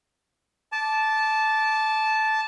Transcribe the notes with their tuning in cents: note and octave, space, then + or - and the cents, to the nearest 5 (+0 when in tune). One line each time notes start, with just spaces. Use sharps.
A5 -10 D6 +0